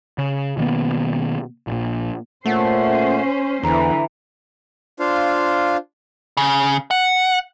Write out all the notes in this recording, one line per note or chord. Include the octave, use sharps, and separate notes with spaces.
C#3
B2 D#3 A#3 B3
A#1 A#2
A#2 A3 C#4 C5 F#5
E2 D3 E3 A#5
D4 F4 C5 F5
C#3
F#5